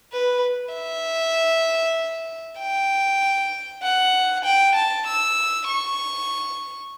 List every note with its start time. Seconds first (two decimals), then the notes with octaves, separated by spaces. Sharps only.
0.13 B4
0.75 E5
2.60 G5
3.83 F#5
4.45 G5
4.75 A5
5.07 E6
5.68 C#6